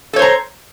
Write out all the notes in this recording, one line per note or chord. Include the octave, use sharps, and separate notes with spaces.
A4 C5 C#5 A#5